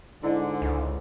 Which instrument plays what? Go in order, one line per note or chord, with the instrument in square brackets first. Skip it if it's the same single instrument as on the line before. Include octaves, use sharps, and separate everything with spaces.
[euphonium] G#2 [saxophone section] D3 [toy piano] E4 G#4
[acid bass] C#2